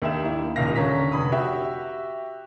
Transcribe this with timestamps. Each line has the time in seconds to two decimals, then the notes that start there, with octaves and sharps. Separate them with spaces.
0.02 D#2 D4 G4 E5 E7
0.23 A#3 D#4 E4
0.56 D#1 C#2 F5 A#6
0.75 D3 C#4 A#5 B6
1.12 F1 B5 D#6
1.32 F#4 G4 E5